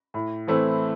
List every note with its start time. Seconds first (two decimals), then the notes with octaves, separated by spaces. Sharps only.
0.14 A2
0.48 E3 A3 C4 E4